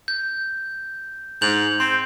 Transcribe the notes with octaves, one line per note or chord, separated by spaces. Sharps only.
G6
G#2 G6 F7 F#7
C4 C6